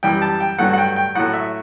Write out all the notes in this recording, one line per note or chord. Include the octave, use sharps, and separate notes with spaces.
F#2 E3 G3 G5
A5
G5
G2 F#3 A3 F#5
F#5
G5
G5
A2 F#3 A3 F#5
E5